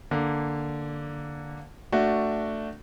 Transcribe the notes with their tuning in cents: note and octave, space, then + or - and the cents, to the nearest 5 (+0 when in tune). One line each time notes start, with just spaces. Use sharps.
D3 +0 A#3 -5
A3 +10 D4 +0 F#4 +0